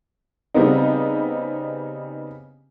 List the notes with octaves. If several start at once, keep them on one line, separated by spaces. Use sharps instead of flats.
C#3 G3 B3 C4 D#4